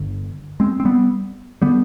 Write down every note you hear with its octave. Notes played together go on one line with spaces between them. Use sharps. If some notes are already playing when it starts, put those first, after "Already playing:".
Already playing: G1 G2 D3
G#3 C4
C4
G3 B3
D3 G3 B3